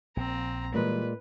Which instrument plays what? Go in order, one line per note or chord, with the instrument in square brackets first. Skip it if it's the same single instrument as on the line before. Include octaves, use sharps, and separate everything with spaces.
[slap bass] A#1 [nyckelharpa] C4 A#5
[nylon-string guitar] A#2 G#3 [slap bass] E3 G3 [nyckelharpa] B4